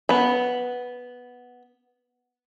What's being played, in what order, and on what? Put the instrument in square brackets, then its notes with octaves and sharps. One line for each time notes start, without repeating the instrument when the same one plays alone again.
[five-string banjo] B3 B5